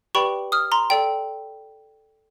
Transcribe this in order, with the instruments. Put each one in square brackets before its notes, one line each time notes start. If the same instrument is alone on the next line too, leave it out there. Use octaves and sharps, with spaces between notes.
[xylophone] G4 B4 D5 G5 B5 C#6
D#6 F6
A#5 C6
A4 D5 G5